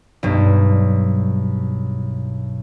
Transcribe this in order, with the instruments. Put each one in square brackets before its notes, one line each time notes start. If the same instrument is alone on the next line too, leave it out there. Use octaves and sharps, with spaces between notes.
[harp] B1 G2